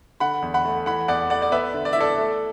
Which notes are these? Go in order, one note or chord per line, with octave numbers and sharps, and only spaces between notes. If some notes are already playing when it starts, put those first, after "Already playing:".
D3 F#5 B5
E2
F#5 B5
A3
E3 F#5 B5
E2 D5 F#5
A3 D5 F#5
D5
B3 B4 E5
D3
D5
E5
E4 A4 D5
A3